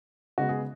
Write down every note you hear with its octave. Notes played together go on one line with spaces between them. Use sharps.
C#3 G#3 B3 F#4
G#4